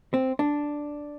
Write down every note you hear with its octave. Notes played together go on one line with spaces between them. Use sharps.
C4
D4